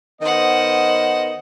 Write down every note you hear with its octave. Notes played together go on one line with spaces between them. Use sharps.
D#3 B3 C5 D#5 F#5